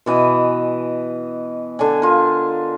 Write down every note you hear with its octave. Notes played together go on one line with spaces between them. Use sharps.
B2 E3 D#5
D3 D4 G#5
F4 A#4